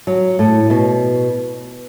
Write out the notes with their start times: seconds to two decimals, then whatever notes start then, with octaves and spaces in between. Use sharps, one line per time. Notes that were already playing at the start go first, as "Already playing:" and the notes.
0.07 F#3
0.39 A2
0.70 B2